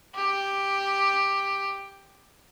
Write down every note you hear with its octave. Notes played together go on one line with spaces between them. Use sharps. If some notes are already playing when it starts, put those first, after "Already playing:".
G4